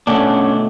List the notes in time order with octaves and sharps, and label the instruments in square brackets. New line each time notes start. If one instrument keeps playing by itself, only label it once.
[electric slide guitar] B2 A3 C#4 D4